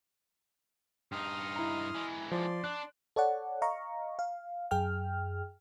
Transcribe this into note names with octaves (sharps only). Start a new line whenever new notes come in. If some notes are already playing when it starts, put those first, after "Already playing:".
G2 D#4 C6 D#6 F6
E4 A#5
E3 G#3
F3 D5 C6
D4 F#6
A4 C#5 D5 F#5
D#5 F5 A#5 C#6
F5
F#2 G#4 G5 F6